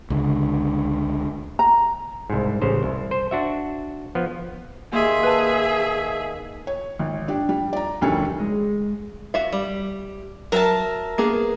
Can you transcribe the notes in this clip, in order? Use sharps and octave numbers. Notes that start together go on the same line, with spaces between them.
C#2 D3
A#5
C2 G#2
A1 C#3 C5
C2
C5
D4 F#4 E5
F3 B3
D#2 G#4 E5 C6
B4 A5
C#5
G#1
D4 G4
G3
D5 A#5
F1 D2 D#3 G3 C#4 A4
G#3
F#4 E5 F5
G3
F#3 A#4 E5 A5
A#3 B3 G#4